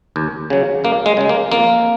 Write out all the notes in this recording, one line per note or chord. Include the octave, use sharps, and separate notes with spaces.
D#2
C#3 F#3
F#2 A#3
G#3
C#3 G#3
A#3
F2 A#3